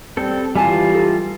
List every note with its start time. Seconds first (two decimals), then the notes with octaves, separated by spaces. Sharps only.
0.17 G3 C4 A4
0.55 E3 G3 F4 G4 E5 G#5 A5
0.90 D#4 A4